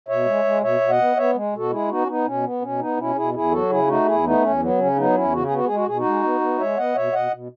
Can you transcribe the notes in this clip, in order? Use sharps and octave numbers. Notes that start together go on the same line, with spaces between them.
B2 C#5 E5
G#3
G#3
B2 C#5 E5
B2
D#5 F#5
B3
B3 C#5 E5
G#3
B2 F#4 A4
G#3 E4 G#4
B3 D#4 F#4
C#4
B3 D#4
B2 C#4
B3
B2 C#4
B3 D#4
B2 C#4 E4
B2 E4 G#4
E2 E4 G#4
F#3 F#4 A4
C#3 E4 G#4
A3 D#4 F#4
E2 E4 G#4
A3 B3 D#4
E2 C#4
F#3 B3
C#3 C#4
F#3 B3 D#4
E2 C#4 E4
C#3 F#4
G#4
B3 F#4
G#3 G#4
F#4
B2 G#4
D#4 F#4
G#3
B3
B3
G#3 C#5 E5
B3 D#5 F#5
B2 C#5 E5
B2 D#5 F#5
B2